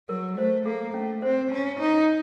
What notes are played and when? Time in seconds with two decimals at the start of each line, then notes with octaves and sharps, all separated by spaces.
0.09 F#3 A#4
0.38 A3 C5
0.66 A#3 A4
0.94 A3 C#4
1.22 C4 C5
1.51 C#4 A#5
1.79 D#4 A#5